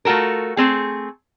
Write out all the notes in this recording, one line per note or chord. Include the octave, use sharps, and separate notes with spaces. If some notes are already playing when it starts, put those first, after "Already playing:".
A3 F4 F#4 A4 A#4
A3 C4 G#4